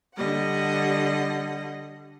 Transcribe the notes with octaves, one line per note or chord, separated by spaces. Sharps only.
D3 G3 D#5 F#5